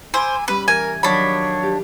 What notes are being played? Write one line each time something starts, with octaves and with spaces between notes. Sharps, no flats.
C5 G#5 B5 D6 E6
G3 C#4 B4 B5
E3 A#4 G#5
D#3 F3 F#3 D4 C#5 B5
G4